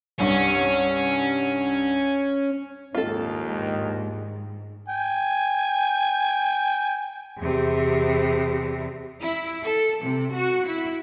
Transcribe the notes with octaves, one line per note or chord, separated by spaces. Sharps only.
C2 G2 C#4
A#1 D#2 G#2 D#3 F4 A4
G5 G#5
E2 C3
E4
A4
C3
F#4
E4